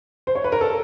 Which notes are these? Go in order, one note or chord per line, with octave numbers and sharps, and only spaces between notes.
C5
C#5
B4
A#4
A4